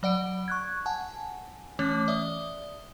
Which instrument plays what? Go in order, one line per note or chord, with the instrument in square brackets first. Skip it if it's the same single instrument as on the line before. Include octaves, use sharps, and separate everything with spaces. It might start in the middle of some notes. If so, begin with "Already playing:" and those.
[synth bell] F#3 D5 F#5 D7
C#6 F#6 G#6
F#5 G#5 A5
E3 A3 C#4 C#5 D6
D5 E5 D#6